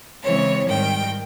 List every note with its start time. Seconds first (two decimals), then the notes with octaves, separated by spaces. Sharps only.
0.23 C#3 E3 G#3 C4 C#5
0.68 G#2 D#3 G3 G5